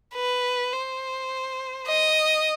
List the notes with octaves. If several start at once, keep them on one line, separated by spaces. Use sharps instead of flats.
B4
C5
D#5